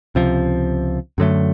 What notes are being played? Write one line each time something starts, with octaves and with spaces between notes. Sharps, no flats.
C#2 C3 F3
F#2 D3 F#3 A3